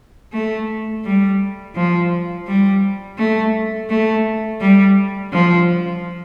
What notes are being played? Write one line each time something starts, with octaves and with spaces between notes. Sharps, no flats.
A3
G3
F3
G3
A3
A3
G3
F3